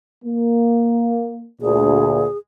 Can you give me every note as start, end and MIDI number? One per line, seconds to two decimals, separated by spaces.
0.25 1.48 58
1.61 2.25 38
1.61 2.25 46
1.61 2.37 68